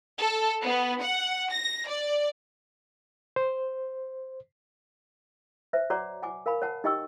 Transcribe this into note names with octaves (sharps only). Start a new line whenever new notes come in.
A4
B3
F#5
A#6
D5
C5
B4 C5 E5
F#4 C#5 D5 F#5 A#5 D6
F#5 G#5 D6
A#4 F5 G#5 B5
C#5 F#5 A5
D#4 G4 D#5 G5 C#6 E6